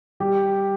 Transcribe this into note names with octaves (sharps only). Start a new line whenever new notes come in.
G3 G4